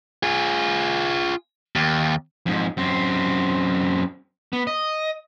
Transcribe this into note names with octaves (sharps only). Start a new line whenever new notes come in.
F4 G#4
D#2
F2 G#2
F#2 C4
B3
D#5